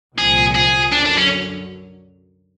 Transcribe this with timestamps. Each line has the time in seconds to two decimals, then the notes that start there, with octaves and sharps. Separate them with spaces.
0.18 C2 A#2 F3 G#4
0.55 G#4
0.93 F#2 D3 F#3 D4
1.06 D4
1.18 C#4